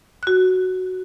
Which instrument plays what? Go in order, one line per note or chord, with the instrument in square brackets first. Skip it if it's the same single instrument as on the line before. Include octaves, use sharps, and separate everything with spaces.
[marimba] F#4 F#6